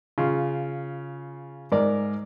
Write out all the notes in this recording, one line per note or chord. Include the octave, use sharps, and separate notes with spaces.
C#3 F4
G#2 A#4 D5